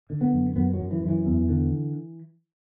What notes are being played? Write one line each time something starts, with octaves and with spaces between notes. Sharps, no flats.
D3
B3
F#2
F#2 B3
F#3
F#2
E3
F#2
E3
E2
D3